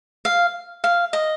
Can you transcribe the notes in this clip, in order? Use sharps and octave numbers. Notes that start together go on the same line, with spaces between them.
F5
F5
D#5